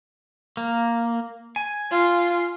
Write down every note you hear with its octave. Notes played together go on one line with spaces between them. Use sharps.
A#3
G#5
F4